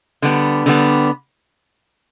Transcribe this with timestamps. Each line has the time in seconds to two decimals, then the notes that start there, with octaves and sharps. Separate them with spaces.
0.22 D3 G3 B3
0.66 D3 G3 B3